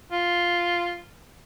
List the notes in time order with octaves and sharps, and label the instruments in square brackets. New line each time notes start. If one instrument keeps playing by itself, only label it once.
[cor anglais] F4